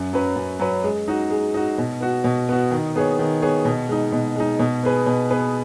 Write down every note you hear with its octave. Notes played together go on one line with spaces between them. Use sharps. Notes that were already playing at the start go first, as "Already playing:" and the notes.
Already playing: F#2
F#3 C#4 B4
F#2
F#3 C#4 B4
G#3
D#4 F#4
G#3
D#4 F#4
B2
B3 F#4
B2
B3 F#4
D#3
B3 G#4 C#5
D#3
B3 G#4 C#5
B2
G#3 D#4
B2
G#3 D#4
B2
B3 G#4 B4
B2
B3 G#4 B4